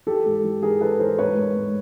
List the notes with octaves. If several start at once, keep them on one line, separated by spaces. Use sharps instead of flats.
E3 G4 A4
G#2
E3
E3 G#4 A#4
E3 A4 B4
E3 A#4 C5
G#2 B4 C#5
G#2
G#2